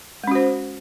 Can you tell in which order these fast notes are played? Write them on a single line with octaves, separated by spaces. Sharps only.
G#3 C#4 F#4 C5